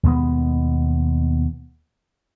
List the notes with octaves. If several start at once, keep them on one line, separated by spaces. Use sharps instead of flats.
D#2 B2 G#3 B3